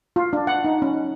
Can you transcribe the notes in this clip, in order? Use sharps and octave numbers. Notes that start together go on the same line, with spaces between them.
F4
D4
F#5
D#4
C#4